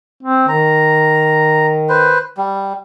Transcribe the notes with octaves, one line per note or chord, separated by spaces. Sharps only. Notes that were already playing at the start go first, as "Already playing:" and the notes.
C4
D#3 A#5
B4 C5
G3